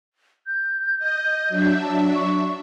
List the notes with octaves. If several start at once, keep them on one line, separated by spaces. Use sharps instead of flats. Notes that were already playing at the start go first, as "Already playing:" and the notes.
G6
D#5
F#3 D4 E5
A5
C#6